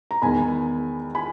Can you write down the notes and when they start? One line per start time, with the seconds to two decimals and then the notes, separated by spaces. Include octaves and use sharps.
0.11 A#5
0.22 E2 D#3 G#5 B5
1.15 G#5 B5